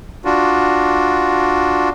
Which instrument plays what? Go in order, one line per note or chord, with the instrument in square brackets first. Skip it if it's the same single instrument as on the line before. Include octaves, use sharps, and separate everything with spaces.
[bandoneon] D4 F4 F#4